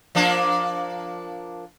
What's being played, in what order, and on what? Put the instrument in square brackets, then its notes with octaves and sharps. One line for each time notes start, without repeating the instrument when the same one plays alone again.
[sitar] F3 A#3 D4